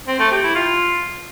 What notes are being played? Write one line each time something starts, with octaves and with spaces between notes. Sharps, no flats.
C4
A3
G4
E4
F4